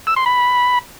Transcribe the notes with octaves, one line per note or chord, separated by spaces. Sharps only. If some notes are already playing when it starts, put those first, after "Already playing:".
E6
C6
B5